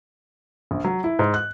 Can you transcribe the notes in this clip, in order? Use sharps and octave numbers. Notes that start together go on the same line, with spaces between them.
A#1
F#3
E4
G#2
F#6